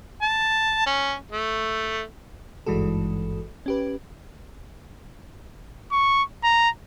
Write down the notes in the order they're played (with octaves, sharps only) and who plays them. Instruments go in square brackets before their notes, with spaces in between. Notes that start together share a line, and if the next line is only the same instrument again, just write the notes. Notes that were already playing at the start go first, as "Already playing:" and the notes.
[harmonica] A5
C#4
A3
[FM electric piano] G#1 G2 E3 G#3 F#4 A4
C#4 G4 B4
[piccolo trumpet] C#6
A#5